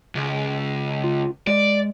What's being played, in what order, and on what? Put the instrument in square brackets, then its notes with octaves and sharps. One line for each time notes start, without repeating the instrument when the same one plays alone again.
[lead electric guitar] C#2
[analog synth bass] F4
[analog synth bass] G#3 [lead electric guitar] D5